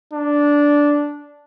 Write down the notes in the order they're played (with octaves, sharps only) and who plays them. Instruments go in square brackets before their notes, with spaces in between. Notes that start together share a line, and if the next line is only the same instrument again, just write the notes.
[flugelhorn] D4